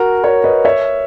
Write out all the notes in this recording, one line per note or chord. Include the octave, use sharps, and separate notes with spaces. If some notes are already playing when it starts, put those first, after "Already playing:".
Already playing: F#4 A#4
A#4 C#5
B4 D#5
C#5 E5